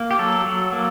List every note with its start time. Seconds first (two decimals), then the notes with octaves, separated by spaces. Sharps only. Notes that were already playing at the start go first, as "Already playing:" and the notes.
Already playing: A#3
0.11 G4
0.19 F#3 A4
0.45 F#3
0.72 A#3